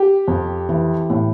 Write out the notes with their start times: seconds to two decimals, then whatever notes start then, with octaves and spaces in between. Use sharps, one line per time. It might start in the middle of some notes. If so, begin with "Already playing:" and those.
Already playing: G4
0.28 F2
0.69 E3
1.10 A2